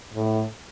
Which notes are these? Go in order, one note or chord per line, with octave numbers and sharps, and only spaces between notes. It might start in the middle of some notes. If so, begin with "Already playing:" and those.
A2